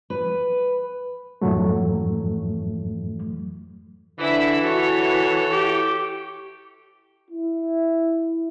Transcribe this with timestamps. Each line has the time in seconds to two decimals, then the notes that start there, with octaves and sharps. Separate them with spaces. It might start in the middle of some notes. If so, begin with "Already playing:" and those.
0.10 B4
1.41 F2 G#2 E3 F#3 A3
4.19 D3 E3 E4 E5
4.62 F#4 A4 C#5
5.53 E4 G4
7.31 E4